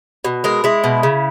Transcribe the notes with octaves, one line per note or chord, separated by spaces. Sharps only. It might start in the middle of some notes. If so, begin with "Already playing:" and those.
B2
G#3 A#4
G#3 E4
B2
C#3